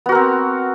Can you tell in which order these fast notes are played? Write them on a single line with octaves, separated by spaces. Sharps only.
B3 F#4 A#4 C4